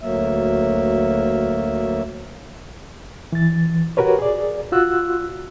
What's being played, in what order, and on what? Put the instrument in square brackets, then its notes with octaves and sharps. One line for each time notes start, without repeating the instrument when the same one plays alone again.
[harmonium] D2 F#3 A#3 E5
[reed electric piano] E3 A6
F#4 G4 A#4 B4 C#5
G#4 D5
F4 F#4 E6 F#6